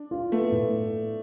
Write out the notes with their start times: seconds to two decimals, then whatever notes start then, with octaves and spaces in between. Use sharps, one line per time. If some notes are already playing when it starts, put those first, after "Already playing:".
Already playing: D4
0.11 F4
0.32 A3 B3
0.52 A2